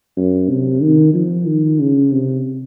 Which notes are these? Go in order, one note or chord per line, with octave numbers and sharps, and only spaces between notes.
F#2
C3
D#3
F3
D#3
C#3
C3